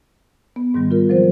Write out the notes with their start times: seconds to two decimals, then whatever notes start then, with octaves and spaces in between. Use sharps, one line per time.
0.56 B3
0.74 G#2 D#3 G3
0.91 F4 A#4
1.09 F3 F#3 C4 C5